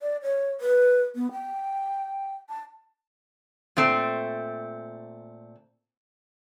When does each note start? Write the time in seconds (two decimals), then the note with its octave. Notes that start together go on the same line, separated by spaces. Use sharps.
0.01 D5
0.23 C#5
0.61 B4
1.15 B3
1.32 G5
2.49 A5
3.77 A#2 A3 C4